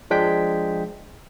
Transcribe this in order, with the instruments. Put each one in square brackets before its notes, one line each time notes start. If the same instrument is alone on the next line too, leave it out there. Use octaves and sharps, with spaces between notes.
[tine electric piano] F3 G#3 D4 G5 B6